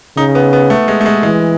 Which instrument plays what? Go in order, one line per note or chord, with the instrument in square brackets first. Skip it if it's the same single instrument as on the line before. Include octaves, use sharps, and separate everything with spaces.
[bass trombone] C#3 [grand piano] D#4
[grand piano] B3
B3
A3
G#3
A3
G#3
[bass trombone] E3 [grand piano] G#3